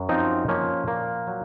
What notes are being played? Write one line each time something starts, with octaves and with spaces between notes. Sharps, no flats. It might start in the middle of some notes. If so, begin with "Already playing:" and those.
Already playing: F#2
F3 C4 D#4
F3 A#3 C#4
A#2 A#3
F#3